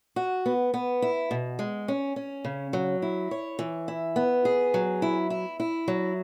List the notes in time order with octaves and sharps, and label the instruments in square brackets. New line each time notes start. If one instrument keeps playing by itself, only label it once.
[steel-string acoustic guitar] F#4
B3
B3
E4
B2
G#3
C#4
C#4
C#3
F#3
E4
C#5
E3
E4
B3
G#4
F#3
E4
E4
E4
F#3